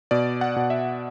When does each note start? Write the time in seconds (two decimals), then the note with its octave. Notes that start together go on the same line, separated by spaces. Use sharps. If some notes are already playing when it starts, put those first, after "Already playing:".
0.11 B2 D5
0.41 F#5
0.56 B2
0.70 E5